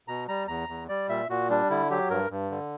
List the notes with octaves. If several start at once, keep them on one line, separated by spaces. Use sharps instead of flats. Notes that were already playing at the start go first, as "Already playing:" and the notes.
B2 A#5
G3 A#5
E2 A#5
E2
G3 D5
A#2 E5
A#2 F#4
G3 D4
D3 E4
F#3 G4
G2 A#4
G2
D3